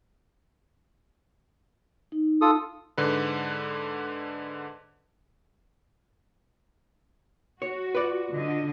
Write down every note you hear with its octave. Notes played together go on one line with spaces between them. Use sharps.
D#4
F4 A4 D#6
G#2 D3 B4
F#4 C#5
F4 B4 D5
D3 D#5